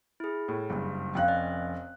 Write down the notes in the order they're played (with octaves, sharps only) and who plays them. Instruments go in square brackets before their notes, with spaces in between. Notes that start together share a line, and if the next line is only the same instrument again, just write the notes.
[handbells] E4 G#4
[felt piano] A2
F#1 G2
[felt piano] F1 C#4 F#6 [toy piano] F5 G5
[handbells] D5 D#5